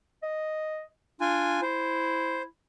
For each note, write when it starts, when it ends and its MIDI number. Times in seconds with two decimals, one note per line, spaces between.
0.23 0.83 75
1.21 1.58 62
1.21 1.61 65
1.21 1.61 80
1.62 2.47 64
1.62 2.42 72